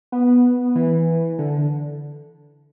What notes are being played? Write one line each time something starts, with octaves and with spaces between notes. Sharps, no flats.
B3
E3
D3